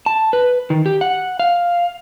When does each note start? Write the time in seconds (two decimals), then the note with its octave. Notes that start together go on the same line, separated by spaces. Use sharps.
0.06 A5
0.33 B4
0.70 D#3
0.86 G4
1.01 F#5
1.39 F5